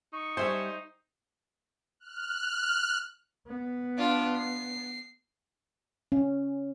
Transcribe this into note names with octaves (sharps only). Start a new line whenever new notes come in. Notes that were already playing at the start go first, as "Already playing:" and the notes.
D#4 C#6
G3 C5 E5 G#5
F6 F#6
B3
D4 F4
C7
C#4